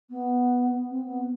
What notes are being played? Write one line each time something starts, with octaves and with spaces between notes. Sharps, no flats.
B3
C4
B3